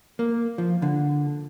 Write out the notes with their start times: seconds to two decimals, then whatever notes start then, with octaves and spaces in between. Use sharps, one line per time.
0.19 A#3
0.58 F3
0.82 D3